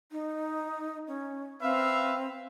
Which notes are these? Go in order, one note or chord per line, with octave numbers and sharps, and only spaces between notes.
D#4
C#4
C4 B4 E5 F5